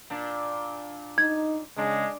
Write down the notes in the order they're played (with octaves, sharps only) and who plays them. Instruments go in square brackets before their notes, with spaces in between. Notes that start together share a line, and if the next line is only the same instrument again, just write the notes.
[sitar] A#2 D4
[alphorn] D#4 [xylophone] G#6
[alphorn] C#3 [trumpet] G#3 [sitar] D4